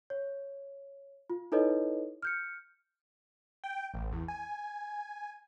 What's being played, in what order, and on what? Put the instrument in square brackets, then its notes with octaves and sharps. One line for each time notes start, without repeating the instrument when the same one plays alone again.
[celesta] C#5
F4
D#4 E4 A4 B4 C#5 D#5
F6 G6 C#7
[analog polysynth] G5
A1
E2
G#5